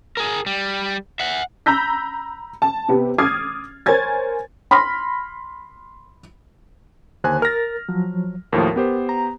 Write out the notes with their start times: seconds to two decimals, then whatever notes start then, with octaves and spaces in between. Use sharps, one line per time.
0.17 G#4 A#4
0.46 G3
1.20 E5 F#5
1.66 A#5 B5 E6 G6 A#6 B6
2.62 A5
2.89 C3 B3 G4
3.18 D6 D#6 F6 G#6 A6 C7
3.86 A#4 C5 C#5 G#5 G#6 A6
4.71 B5 C6 F6 A#6
7.24 D#2 D3 C5 G#5 F#6
7.42 A#4 F6 A6 A#6
7.89 F3 F#3
8.53 D#2 A2 F3 A#4
8.76 B3 G4 C5
9.09 A#5